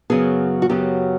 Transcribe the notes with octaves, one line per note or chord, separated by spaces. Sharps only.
F#2 C#3 F#3 B3 G#4
F#4
F#2 C#3 F#3 B3 G4